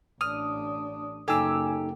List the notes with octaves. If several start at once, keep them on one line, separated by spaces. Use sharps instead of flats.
A1 D4 D#6 F6
F#1 D#4 G4 A4 G#5 E6